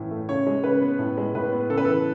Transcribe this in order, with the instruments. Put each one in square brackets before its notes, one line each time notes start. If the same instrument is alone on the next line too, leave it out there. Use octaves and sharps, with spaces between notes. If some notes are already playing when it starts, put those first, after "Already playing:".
Already playing: [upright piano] A2 E3 C#4
A3
C#3 C#5
G#3
C#3 B4
B3
A2
G#3
A2 B4
B3
C#3 A4
B4
E3 A4